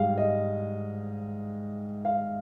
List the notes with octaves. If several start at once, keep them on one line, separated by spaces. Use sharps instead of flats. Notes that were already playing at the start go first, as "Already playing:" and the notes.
Already playing: G#2 G3 F5
D#5
F5